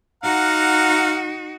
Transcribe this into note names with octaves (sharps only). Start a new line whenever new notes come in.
D#4 F#4 F5 F#5 A#5